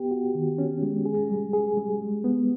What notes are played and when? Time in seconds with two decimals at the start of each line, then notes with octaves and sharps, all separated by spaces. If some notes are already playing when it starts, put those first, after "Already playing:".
Already playing: B3 G4
0.11 F#4
0.35 D#3
0.58 C#4
0.83 G#3
1.06 G#4
1.30 G3
1.53 G#4
1.77 G3
2.01 G#3
2.24 B3